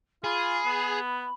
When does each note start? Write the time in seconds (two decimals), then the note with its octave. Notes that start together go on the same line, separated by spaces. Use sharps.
0.24 F4 G#4 B5
0.66 B3